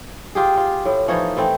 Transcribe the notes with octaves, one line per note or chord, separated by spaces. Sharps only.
F4 G4 G#4
F4
A2
E3 F3 D#4 C#5
E3 A3 C4